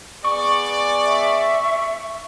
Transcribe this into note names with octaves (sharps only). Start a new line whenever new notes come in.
B3 G#4 D5 C#6
E5